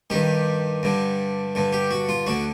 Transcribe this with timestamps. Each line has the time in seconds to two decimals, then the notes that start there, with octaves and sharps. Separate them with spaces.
0.10 G2 D#3 G4
0.83 G2 D3
1.55 G2 D3
1.73 G4
1.91 F#4
2.09 F4
2.27 D2 D3 F#4